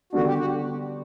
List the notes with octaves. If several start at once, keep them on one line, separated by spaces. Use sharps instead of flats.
D3 G3 B3 D4 F#4
G4
F#4